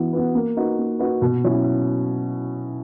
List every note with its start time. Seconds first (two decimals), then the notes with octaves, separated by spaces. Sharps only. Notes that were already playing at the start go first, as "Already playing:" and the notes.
Already playing: E3 B3 F#4
0.13 B3 F#4 B4
0.35 A#3
0.57 D#4 F#4 B4
0.78 A#3
0.99 D#4 F#4 B4
1.22 B2
1.44 F#3 C#4 E4